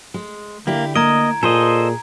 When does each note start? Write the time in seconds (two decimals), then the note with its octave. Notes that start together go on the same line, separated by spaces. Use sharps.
0.14 G#3
0.67 D3 A#3 E4 G4
0.96 A#3 D#5 A#5 G#6 D7
1.43 A#2 G#4 A4 C5 D#5